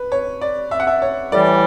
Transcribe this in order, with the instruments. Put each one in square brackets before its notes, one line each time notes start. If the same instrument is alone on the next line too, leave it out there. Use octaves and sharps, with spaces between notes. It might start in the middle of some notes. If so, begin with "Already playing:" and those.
Already playing: [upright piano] B4
C#5
D5
E5
F#5
E5
C#5
[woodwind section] A2 E3 G3 [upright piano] D5